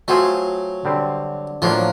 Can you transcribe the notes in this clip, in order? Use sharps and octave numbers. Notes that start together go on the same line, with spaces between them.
F#3 A3 C4 F4 G#4 C5
D3 G3 C4
A2 F3 F#3 A#3 D4